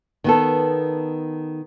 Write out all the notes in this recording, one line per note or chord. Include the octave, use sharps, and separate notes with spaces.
D#3 B3 A4